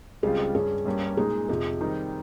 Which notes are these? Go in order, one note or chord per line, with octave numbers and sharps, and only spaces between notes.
C#2 C#3 G3 C4 F4 G#4
G2 G3 C#4 G#4
G2 G3 A#3 C#4
A#2 G#3 D#4 G#4
F2 C3 F3 G#4
D#3 G3 C4 D#4